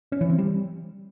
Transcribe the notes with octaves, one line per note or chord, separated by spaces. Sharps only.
C#4
E3
C4
G3